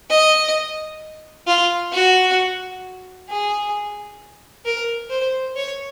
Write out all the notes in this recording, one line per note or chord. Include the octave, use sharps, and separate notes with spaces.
D#5
F4
F#4
G#4
A#4
C5
C#5